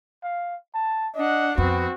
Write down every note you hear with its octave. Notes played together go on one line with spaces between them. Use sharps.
F5
A5
D4 D#5 F#5
F2 B3 C4 F#4